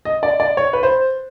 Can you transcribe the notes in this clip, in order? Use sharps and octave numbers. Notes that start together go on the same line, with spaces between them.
D#5
D5
D5
C#5
B4
C5